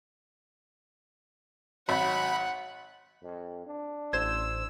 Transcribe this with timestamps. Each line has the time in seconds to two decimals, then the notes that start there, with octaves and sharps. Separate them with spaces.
1.89 G#1 F#3 F#5 B5
3.22 F2
3.66 D4
4.13 A1 C5 E6 G#6 E7